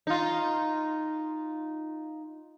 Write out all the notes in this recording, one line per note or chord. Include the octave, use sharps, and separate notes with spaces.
D#4 F4